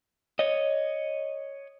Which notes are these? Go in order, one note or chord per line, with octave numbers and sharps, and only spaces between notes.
C#5 D#5